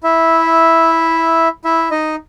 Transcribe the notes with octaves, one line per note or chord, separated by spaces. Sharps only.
E4 E5
E4 E5
D#4 D#5